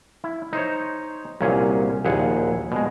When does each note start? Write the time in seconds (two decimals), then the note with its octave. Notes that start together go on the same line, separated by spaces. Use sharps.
0.24 E4
0.53 D#4 C5 C#5
1.41 C2 A#2 F#3 C#4 G#4
2.05 A#1 D#2 E4 G#4 F#5
2.72 B2 G#3